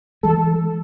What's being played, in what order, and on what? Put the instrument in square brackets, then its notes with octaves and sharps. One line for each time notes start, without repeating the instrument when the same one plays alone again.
[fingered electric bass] E3 G#3 [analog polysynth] A4